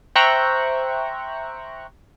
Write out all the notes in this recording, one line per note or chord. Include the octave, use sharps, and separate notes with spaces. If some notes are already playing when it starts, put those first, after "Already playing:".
C5 E5 G5 A#5 C#6 F#6